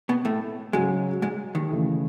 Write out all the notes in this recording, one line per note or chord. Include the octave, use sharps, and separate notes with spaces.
B2 B3
A2 A3
G#2 C#3 F#3 G#3 C#4
G#2 G#3
D#2 D#3
C#3 E3 A3 E4